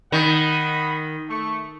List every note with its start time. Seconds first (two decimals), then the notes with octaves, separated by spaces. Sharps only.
0.12 D#3 D#5 F#5 B5
1.29 A3 C#6